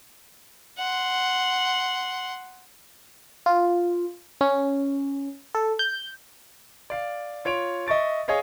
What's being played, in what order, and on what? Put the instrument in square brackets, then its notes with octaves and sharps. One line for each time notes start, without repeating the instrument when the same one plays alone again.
[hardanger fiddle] F#5 C6
[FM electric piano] F4
C#4
A4
G6
[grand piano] D5 F5
F4 C#5 D7 F7
D#5 E5 C#6 A6 D7
G#4 C#5 D#5 F5